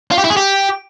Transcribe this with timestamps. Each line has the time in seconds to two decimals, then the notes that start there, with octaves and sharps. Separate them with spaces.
0.11 F4
0.18 G4
0.24 E4
0.30 G#4
0.37 G4